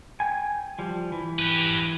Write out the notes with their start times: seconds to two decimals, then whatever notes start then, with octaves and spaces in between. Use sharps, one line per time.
0.20 G5 G#5
0.79 F3 G3
1.12 E3
1.39 G4 B4